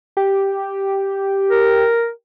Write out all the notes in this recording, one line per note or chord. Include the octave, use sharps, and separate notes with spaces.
G4
A#4